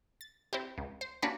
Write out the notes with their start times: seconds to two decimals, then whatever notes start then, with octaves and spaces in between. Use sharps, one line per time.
0.21 A6
0.53 C4 E4 G4
0.78 C#2
1.01 C5
1.22 A#3 C#4 D4 F#4 G4 B4